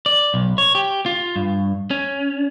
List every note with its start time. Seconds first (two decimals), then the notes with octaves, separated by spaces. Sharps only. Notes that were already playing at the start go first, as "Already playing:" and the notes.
0.06 D5
0.34 B1
0.58 C#5
0.75 G4
1.06 F4
1.36 G2
1.91 C#4